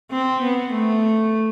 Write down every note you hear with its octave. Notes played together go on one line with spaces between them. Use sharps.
C4
B3
A3